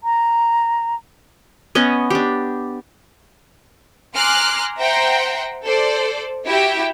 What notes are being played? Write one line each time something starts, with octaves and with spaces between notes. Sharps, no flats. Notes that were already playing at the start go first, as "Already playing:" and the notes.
A#5
B3 C#4 D#5
D4 G4
G#5 A#5 C6 D6 F6 F#6
C5 E5 F#5 G5 A#5 C6
A4 C5 D5
E4 F#4 G4 E5 G5